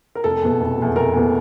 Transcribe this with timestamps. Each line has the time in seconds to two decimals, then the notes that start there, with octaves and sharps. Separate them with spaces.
0.15 A#4
0.24 F1 A4
0.42 E2 B2
0.60 F1
0.78 E2 B2
0.96 F1 A#4
1.13 E2 B2